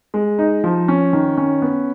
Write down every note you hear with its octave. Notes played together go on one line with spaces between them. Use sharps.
G#3
D#4
F3
C#4
D#3
C#4
B3